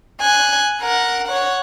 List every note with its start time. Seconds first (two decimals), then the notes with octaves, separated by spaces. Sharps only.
0.21 G#5 F#6
0.82 A#4 F#5
1.28 C#5 F#5